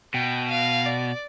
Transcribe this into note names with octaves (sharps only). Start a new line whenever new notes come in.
B2 G5
F5
D5